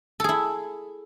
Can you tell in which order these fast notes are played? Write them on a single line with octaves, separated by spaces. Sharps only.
A4 G#4 E4